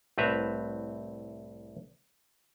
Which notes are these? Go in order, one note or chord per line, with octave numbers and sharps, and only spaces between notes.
C2 A2 C4 B4 E5 A#5